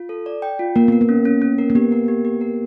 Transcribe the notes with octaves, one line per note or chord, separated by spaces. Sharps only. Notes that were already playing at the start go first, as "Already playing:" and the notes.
Already playing: F4
A4
D5
G5
F4
A#3 A#4
B3 A#4
A#3
C#4
C#4
C#4
A#4
A#3
B3 G4
A#4
G4
G4
A#4